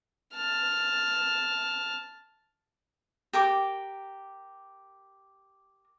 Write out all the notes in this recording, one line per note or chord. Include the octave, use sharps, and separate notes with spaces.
A5 F6
G4 A#4 D6